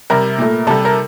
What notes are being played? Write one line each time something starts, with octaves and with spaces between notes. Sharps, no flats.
C3 G3 A#4
A#2 A3
C3 G3 A4
A#4